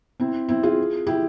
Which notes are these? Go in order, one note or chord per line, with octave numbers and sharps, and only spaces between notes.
C4 E4
C4 E4
F4 G#4
E4 G4